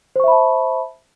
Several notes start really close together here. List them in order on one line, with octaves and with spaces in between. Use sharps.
C5 C#6 E5 B5 A5